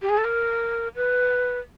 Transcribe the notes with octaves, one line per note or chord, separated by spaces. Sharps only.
G4
G#4
A4
A#4
B4